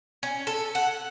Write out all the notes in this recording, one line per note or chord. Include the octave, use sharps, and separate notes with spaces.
C#4
A4
F#5